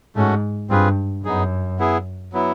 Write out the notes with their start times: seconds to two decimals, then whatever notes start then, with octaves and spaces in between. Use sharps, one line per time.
0.16 G#2 A3 C#4 F#4
0.69 G2 C4 F4 G#4 B4
1.24 F#2 B3 D#4 G#4
1.79 B3 E4 G#4
2.33 F#3 B3 E4